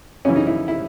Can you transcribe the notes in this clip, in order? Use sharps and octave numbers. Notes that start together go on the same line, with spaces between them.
F#2 C#3 E3 C#4
D#4
E4
E4